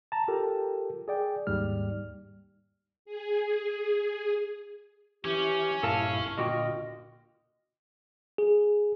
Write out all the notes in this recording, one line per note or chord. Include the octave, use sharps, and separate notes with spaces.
A5 A#5
F4 G4 A4 A#4 G5
G#4 D5 G5
D#2 G#2 G3 F6
G#4
E3 C#4 G4
G2 A#2 E4 A4 F5 A5
A#2 D3 F4 F#4 D#5 G5
G#4